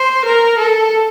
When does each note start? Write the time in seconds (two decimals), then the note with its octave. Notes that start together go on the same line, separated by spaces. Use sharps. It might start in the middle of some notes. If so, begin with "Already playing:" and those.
Already playing: C5
0.25 A#4
0.58 A4